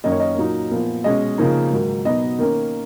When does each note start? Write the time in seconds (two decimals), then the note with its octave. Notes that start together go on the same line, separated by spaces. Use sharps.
0.04 F#2 D#3 A#3 C#4 D#5
0.12 C#5
0.20 D#5
0.38 A#2 F#3 A#3 D#4
0.71 A#2 F3 B3
1.04 B2 G#3 C#4 D#5
1.38 C#3 F3 A#3 D#4
1.72 G#2 D#3 F#3
2.05 B2 F#3 B3 D#4 D#5
2.39 D#3 A#3 C#4